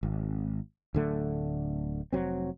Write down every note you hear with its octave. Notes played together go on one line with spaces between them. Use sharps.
G#1
D1 D3 A3
F1 F#3 C4